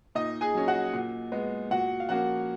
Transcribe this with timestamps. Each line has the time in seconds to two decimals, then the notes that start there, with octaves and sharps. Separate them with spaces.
0.15 A#2 D#4 D#5
0.41 G#4 G#5
0.54 F#3 C#4
0.68 F#4 F#5
0.93 A#2
1.32 G#3 B3
1.71 A#2 F#4 F#5
2.00 F5
2.09 F3 A#3 C#4 F#4 F#5